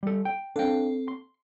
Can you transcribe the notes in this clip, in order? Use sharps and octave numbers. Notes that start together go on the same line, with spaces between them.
G3 A4
G5
C4 D4 A4 F5 G5
C6